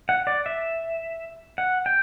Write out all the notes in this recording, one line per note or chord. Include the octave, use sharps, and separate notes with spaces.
F#5
D5
E5
F#5
G5